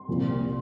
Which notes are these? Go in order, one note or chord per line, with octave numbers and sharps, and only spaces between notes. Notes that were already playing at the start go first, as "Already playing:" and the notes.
Already playing: C6
C2 A#2 F3